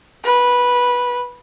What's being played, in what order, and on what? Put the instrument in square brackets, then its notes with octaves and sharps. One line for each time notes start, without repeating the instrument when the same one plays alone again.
[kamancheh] B4